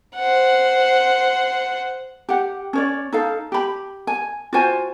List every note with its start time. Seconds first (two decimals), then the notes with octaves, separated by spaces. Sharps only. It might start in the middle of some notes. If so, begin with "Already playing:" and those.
0.16 C5 F#5
2.29 G4 F#5
2.73 C#4 C#5 D5
3.12 D#4 A4 F5
3.52 G4 B5
4.07 G#5
4.53 F4 F#4 C5 G#5